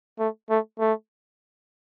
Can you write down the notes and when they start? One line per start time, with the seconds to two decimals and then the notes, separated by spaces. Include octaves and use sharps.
0.19 A3
0.50 A3
0.79 A3